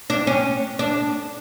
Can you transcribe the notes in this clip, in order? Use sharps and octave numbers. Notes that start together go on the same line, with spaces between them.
D4
C#4
D4